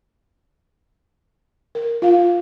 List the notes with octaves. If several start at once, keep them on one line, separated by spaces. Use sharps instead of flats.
A#4
F4 F5